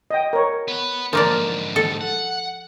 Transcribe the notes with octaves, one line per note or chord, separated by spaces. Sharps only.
D#5 G5
A#4 C#5
B3 B4
G#2 D3 F3 A#3 A#4 D5
A4
F#5